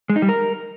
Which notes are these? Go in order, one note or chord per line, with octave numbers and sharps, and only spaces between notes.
G#3
D#4
G3
A#4